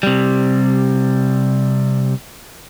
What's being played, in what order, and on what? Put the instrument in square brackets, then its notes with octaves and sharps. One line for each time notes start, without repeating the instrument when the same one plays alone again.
[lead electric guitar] C3 G3